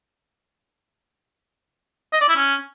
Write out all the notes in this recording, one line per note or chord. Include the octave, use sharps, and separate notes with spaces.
D#5
D5
E4
C#4